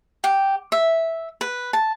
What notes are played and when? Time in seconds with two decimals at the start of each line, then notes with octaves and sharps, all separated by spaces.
0.24 G4
0.72 E5
1.41 B4
1.73 A5